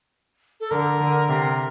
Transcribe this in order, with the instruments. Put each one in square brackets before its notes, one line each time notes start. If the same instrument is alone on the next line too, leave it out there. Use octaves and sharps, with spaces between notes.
[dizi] A4
[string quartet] D3 [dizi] A#4
[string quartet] D3
C3